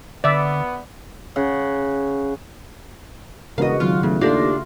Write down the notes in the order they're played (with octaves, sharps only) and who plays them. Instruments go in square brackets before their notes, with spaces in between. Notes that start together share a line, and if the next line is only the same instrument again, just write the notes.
[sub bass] D3 [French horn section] B3 [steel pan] D5 E5
[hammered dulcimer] C#3 F#5
[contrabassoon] E1 [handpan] C#3 F#4 [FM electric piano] A#4 B4 [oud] D#5 F5
[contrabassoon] G#1 [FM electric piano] D#3 F#3 [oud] F4
[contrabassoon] E2 [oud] C#3 [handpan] A3
[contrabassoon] D#2 [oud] D4 G4 D5 [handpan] F4 [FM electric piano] A4 A#6 C7